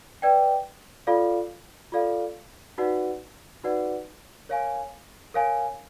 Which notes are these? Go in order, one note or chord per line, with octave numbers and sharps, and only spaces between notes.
B4 D5 G5
F4 A4 D5 F5
F4 A4 D5 F5
D#4 F#4 B4 D5 F#5
D#4 F#4 B4 D5 F#5
A#4 C#5 F5 G#5
A#4 C#5 F5 G#5